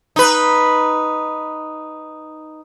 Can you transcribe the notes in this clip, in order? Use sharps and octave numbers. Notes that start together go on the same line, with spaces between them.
D#4 B4